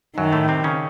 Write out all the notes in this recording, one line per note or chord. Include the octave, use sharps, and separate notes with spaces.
F#2 D#3 F#3
A2 A3
C3 C4
C#3 C#4